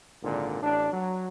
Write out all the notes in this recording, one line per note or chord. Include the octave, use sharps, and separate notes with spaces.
G#1 A#2 D3
A1 D4
F#3